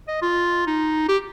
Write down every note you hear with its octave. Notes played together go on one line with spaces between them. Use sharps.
D#5
F4
D#4
G4